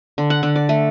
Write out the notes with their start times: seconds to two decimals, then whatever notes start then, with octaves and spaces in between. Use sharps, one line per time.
0.18 D3
0.30 F#5
0.43 D3
0.56 D5
0.69 A3